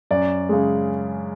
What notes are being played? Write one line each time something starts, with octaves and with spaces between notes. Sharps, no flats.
F#2 D5
C#3 G#3